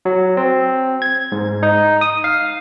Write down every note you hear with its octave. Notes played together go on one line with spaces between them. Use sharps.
F#3
C4
G#6
G#2
D#4
D#6
F5